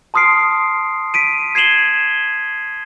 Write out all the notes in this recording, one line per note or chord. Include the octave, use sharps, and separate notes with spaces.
A5 C6 D#6 F6 C7 D7
B6 D7 D#7
G#6 C7 D#7 E7 F#7 G7